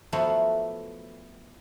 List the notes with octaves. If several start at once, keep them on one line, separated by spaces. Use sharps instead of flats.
F3 F#3 A3 B3 E4 F4